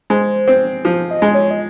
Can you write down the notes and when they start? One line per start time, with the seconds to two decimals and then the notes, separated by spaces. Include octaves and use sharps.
0.10 G#3 C5
0.48 C4
0.85 F3
1.11 D#5
1.22 G#3
1.34 C#5
1.50 D#5